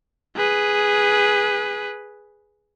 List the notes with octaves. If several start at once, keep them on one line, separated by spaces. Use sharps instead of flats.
G#4 B4